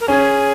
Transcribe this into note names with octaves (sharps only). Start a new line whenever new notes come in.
A#4
C#4 G#4